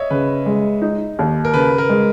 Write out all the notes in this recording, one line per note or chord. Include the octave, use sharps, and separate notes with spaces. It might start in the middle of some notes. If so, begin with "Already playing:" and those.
Already playing: C#5 D#5 E5
C#3 B4
G#3
D#4
D#2
A#4
C#3 B4
A#4
G#3